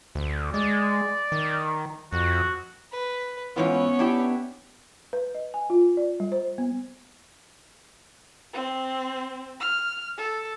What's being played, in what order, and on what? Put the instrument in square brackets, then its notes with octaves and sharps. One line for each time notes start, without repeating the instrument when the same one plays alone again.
[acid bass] D2
[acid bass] G#3 [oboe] D5
[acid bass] D#3
[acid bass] F2 [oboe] F#4
[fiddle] B4
[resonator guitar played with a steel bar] G#2 E3 F4 [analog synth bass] B3 [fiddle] C#4 C#5
[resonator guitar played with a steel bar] D4 E4 G4
[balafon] B4
D#5
G#5
F4
D5
G3
C5
B3
[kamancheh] C4
F6
A4